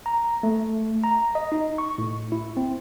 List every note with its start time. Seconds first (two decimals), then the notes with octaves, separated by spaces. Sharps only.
0.06 A#5
0.43 A3
1.04 A#5
1.35 D#5
1.52 D#4
1.78 C#6
1.98 A2
2.32 E4
2.57 C4